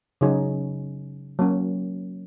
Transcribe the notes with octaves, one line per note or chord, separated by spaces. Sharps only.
C#3 F#3 D#4 G#4 C#5
F#3 A#3 C#4